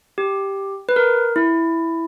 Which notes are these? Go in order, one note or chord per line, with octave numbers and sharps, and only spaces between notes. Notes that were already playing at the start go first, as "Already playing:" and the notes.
G4
B4
A#4
E4